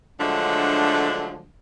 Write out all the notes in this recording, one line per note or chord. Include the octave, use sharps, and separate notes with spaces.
D3 F3 F#3 G#3 A3 D4